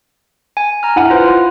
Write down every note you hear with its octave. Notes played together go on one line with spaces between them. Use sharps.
G#5
A#5 F6
E4 F#5 D#7
F4 B4 C5